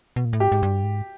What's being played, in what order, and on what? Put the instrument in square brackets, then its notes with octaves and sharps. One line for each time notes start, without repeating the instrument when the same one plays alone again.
[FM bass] B2
A#2
A2
[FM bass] G#2 [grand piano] G4
[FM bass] G#2
G2
G#2